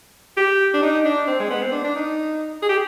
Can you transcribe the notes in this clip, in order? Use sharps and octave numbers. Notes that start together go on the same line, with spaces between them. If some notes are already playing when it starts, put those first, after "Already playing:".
G4
D4
D#4
D4
C4
G#3
B3
C4
D4
D4
D#4
G#4
G4